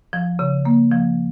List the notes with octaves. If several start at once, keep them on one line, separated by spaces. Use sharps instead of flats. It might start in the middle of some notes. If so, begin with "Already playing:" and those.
F3
C#3
A#3
F3